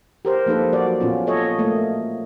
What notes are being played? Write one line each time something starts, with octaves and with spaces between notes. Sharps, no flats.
G4 A#4 C5
F3 A#3 D#4 A4 B4
F#3 F#4 D5
A#2 B3 C#4 F4
A4 C#5 D#5
A3 A#3 D#5